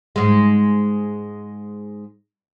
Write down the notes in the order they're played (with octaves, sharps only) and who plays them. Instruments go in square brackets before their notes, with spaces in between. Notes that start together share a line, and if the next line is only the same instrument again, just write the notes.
[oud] G#2 G#3